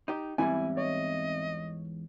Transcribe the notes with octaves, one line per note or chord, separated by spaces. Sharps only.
D#4 G4
E2 G#2 G3 C4 E4 E5 G#5
C#5 D#5